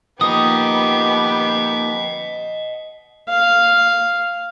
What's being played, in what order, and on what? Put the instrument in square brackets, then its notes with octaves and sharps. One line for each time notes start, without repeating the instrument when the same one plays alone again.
[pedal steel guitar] F3 A#3 D#4 [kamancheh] B3 G4 [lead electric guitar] D#5 F#5 [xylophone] D#6
[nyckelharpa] F5